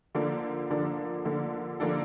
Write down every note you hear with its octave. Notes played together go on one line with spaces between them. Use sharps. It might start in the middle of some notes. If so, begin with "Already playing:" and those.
D3 F3 A#3 D4 A4
D3 F3 A#3 D4 A4
D3 F3 A#3 D4 A4
D3 F3 A#3 D4 A4